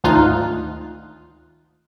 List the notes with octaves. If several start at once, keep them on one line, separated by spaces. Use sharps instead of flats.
G#1 D2 D#4 F4 F#6